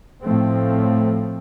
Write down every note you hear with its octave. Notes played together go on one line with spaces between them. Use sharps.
A2 F3 A3 C4